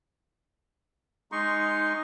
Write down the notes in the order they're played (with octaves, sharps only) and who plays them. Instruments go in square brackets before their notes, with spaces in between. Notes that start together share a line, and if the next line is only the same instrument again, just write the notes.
[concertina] G#3 C6 C#6 [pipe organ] D#4